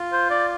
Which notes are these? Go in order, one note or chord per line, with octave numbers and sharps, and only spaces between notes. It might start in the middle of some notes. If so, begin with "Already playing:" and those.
Already playing: F4
C5
D5